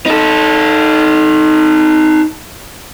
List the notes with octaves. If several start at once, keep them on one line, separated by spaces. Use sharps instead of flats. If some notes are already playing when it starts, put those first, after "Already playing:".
D#4 A4